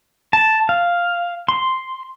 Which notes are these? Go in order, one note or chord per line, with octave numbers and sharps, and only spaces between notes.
A5
F5
C6